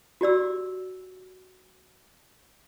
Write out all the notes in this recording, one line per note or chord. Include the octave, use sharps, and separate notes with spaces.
F#4 G4 D5 E6